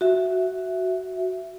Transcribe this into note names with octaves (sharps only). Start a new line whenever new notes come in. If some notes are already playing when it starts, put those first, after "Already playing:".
F#4 E5